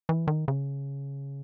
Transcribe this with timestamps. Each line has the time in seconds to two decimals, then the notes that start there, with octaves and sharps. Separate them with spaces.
0.09 E3
0.28 D#3
0.48 C#3